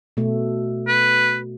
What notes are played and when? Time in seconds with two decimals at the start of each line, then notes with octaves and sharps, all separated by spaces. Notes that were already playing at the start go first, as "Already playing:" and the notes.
0.17 B2 A3
0.88 B4